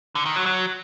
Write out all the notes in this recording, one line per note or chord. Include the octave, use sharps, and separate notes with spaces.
D3
D#3
F#3
F#3